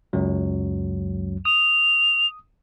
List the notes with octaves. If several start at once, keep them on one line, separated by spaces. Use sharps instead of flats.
C#2 F#2 F#3
D#6 F7